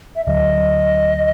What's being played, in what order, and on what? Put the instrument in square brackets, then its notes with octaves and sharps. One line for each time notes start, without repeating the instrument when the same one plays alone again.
[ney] E5
[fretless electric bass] D2 D3 F#3 [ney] D#5